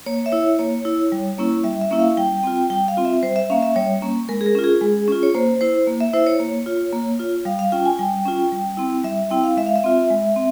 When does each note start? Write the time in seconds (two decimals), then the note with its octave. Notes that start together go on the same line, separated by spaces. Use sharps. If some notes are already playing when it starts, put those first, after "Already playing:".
0.06 A#3 C#5
0.26 E5
0.32 E4 C#5
0.59 A#3 C#5
0.85 E4
1.12 G3
1.38 A#3 C#4 E4
1.64 G3 E5
1.81 E5
1.91 A#3 C#4 E4
1.99 F5
2.17 G3 G5
2.43 C4 F4
2.70 G3 G5
2.88 F5
2.97 C4 F4
3.05 E5
3.22 G3 C5
3.36 E5
3.50 A#3 C#4 F5
3.63 E5
3.76 G3 C#5
4.02 A#3 C#4
4.29 G#3 A#4
4.41 G#4
4.46 A#4
4.55 C#4 F4
4.64 G#4
4.81 G#3
5.08 C#4 F4
5.23 C#5
5.35 A#3 C5
5.61 E4 C5
5.87 A#3
6.00 E5
6.13 E4 C5
6.26 C#5
6.40 A#3
6.66 F4
6.92 A#3
7.19 F4
7.45 G3 F5
7.59 F5
7.72 C#4 F4 G5
7.86 G#5
7.99 G3 G5
8.26 C#4 F4
8.52 G3
8.77 C4 E4
9.04 G3 E5
9.31 C4 E4 G5
9.44 F5
9.57 G#3 E5
9.67 F5
9.76 E5
9.84 C4 F4
10.10 G#3
10.36 C4